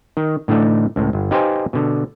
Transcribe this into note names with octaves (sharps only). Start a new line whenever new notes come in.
D#3
A2 D3 E3 A3 D#4
C#2 A2
G1
D#4 G4 B4 C5 F5 G#5
B2 D3